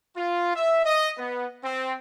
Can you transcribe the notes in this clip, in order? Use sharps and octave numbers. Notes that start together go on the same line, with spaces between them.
F4
E5
D#5
B3
C4